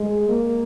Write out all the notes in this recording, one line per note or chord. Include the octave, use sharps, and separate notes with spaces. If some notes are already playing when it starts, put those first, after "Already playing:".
Already playing: G#3
A#3